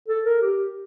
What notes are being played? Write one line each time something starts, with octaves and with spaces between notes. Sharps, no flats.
A4
A#4
G4